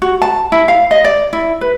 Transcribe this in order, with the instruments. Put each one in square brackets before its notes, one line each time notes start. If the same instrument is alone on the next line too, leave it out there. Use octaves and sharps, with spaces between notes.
[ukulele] F#4
A5
E4
F5
D#5
D5
E4
B4